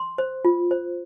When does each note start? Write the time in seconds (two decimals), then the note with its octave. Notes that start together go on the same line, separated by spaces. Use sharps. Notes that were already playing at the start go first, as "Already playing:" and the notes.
Already playing: C6
0.18 C5
0.45 F4
0.71 C5